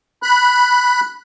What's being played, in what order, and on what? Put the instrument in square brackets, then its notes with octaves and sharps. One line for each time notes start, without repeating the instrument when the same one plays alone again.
[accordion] B5 F#6